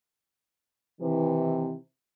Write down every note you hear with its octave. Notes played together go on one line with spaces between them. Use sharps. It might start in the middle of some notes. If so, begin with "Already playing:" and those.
C3 D#3 E3